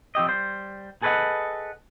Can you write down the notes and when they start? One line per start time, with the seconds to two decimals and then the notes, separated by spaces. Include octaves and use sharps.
0.15 F3 C4 G4 D#5
0.27 G3 C5
1.02 G#4 A4 B4 C5 D#5 F#5